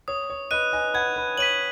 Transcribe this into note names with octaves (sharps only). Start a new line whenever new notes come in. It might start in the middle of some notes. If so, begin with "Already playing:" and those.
C#5 D#6
C#5
B4 D#5 F#6 D#7
D#5 G#5
F#5 B5 G#6
B4
C#5 B6 D#7 F#7